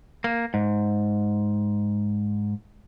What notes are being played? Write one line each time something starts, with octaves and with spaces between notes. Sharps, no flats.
A#3
G#2